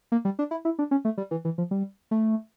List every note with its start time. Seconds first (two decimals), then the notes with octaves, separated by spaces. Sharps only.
0.12 A#3
0.25 G3
0.39 D4
0.51 E4
0.65 E4
0.79 D4
0.91 C#4
1.05 A3
1.17 G3
1.31 E3
1.45 E3
1.58 F3
1.71 G3
2.11 A3